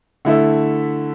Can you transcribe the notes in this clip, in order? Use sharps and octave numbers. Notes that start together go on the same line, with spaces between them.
D3 A3 E4 A4 E5